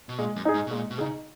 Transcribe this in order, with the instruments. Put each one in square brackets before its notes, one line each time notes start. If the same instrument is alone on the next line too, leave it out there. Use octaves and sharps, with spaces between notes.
[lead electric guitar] B2
[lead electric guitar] A#2 [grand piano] G#3
[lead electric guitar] F#2
[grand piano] D#4 G#4
[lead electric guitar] G#2
B2
[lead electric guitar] A#2 [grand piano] G#3
[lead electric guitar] B2
[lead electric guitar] C#3 [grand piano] D#4 G#4